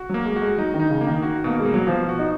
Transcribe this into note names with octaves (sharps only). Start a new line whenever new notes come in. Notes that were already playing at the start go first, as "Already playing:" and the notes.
Already playing: F#4
F#3 A#3
G#3
F#4
G#3
F#3 D#4
D#3
D#4
C#3
A#3
D#3
F#4
B2 A#3
G#3
A#3
F#3
B2 F3
F#4
D#4